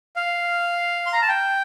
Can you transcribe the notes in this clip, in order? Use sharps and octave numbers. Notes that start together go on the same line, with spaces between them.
F5
C6
A#5
A5
G5